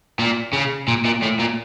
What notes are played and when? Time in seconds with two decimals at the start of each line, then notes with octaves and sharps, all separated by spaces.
0.19 A#2
0.53 C#3
0.88 A#2
1.05 A#2
1.22 A2
1.39 A#2